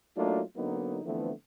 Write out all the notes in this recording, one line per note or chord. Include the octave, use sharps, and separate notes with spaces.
F#3 A3 A#3 D4 D#4 F4
D3 F#3 A#3 B3 D#4
D3 E3 F3 A3 B3 C4